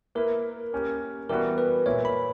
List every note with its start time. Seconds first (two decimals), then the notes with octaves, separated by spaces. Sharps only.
0.15 A#3 E4 A#4 B4
0.73 A#3 C#4 G4 A#4
1.29 E3 G3 B3 F#4 A#4
1.58 B4
1.86 A#2 A#3 E4 A#4 C#5
2.05 B5